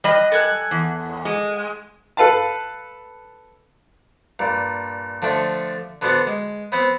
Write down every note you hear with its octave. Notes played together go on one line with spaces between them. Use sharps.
G3 D#5 B5 F#6
A4 G#5 F#6
E2
G#3
A4 B4 F5 A5
G2 A#2
D3 F3 A3 D4
D3 B3 F#4 C5 D5
G#3
B3 C4 B4 C5